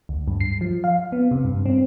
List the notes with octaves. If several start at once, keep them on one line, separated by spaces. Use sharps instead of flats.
D2
G2
C7
F3
F5
B3
C3
G2
C4